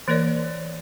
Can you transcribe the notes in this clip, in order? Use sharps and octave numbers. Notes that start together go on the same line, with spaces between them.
E3 A#3 A#4 C#5 D5